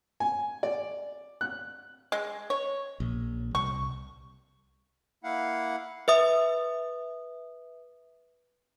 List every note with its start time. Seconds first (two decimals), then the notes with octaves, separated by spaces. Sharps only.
0.20 G#5
0.63 D5
1.41 F#6
2.12 G#3
2.50 C#5
3.00 A#1
3.55 C2 C#6
5.24 A#3 E4 F5 F#5
6.08 B4 E5 D#6